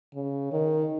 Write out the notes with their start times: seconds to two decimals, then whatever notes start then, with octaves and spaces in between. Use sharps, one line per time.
0.15 C#3
0.52 D#3